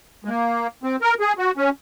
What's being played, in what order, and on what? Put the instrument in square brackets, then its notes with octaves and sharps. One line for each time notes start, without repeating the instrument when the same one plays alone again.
[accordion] G#3
A#3
C4
A#4
G#4
F#4
C#4